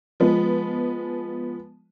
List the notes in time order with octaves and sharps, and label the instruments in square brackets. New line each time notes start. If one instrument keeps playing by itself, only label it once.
[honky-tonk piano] F3 G#3 B3